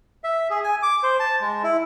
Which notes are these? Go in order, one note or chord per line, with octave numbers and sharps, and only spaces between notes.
E5
G#4
G#5
D6
C5
A5
G#3
E4